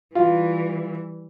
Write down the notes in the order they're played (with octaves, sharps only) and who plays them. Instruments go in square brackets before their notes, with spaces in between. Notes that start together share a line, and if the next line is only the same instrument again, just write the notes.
[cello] E3 G3 [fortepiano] F4